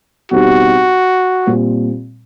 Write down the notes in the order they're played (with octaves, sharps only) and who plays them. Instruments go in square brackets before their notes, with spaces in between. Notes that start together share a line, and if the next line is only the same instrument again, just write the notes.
[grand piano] B2 G3 C4 D#4 G4 [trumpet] F#4
[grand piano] A#2 G3 C4